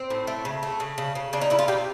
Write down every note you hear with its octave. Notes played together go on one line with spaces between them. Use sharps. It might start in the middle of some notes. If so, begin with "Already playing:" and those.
Already playing: C4
A2
A3
C#3
A3
C#3
C#3
C#3
C#3 D4
D#4
C#3 E4
F4
C3 G4